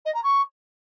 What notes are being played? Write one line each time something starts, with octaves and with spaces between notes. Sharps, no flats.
D#5
A#5
C#6